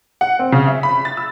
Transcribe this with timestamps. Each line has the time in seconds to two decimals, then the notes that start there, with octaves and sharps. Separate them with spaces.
0.21 F#5
0.39 C4
0.52 C#3
0.67 E5
0.83 B5
1.05 A6
1.17 E6